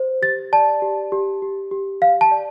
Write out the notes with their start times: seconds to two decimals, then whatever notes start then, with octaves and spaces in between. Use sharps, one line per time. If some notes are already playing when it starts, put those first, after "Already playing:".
Already playing: C5
0.22 G4 A6
0.53 D5 A5
0.82 G4
1.12 G4
1.42 G4
1.71 G4
2.01 G4 F5
2.21 A5
2.31 D5